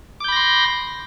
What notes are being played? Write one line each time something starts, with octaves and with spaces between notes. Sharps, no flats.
B5 C6 D6 G6 A#6